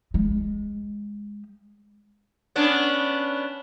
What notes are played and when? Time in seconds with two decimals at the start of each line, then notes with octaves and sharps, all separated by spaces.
0.14 G#3
2.56 B3 C#4 D4